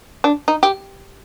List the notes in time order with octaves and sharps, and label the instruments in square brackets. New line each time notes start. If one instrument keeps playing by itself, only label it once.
[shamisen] D4
D#4
G4